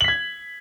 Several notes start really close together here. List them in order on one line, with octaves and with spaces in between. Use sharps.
F#7 B6 G#6